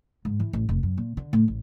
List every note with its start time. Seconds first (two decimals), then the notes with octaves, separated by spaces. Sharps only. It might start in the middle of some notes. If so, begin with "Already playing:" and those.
0.25 G#2
0.40 E3
0.53 A1
0.69 F1
0.83 F#2
0.98 A#2
1.17 D3
1.33 A2
1.48 A1